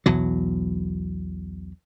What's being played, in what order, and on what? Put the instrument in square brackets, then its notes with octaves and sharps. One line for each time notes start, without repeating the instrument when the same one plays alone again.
[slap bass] B1 E2 F#3